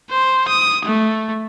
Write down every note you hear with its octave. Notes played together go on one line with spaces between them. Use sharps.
C5
D#6
A3